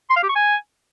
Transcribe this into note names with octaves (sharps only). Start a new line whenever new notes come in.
C6
F5
G4
C#6
G#5